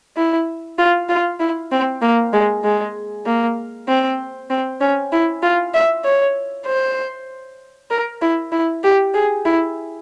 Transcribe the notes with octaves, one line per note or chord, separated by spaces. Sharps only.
E4
F4
F4
E4
C4
A#3
G#3
G#3
A#3
C4
C4
C#4
E4
F4
E5
C#5
C5
A#4
E4
E4
G4
G#4
E4